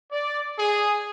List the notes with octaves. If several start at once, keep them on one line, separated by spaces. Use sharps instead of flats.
D5
G#4